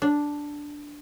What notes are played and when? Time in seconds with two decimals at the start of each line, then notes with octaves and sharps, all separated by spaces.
0.02 D4